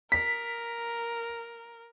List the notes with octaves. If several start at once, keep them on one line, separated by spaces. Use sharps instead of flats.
A#4 B6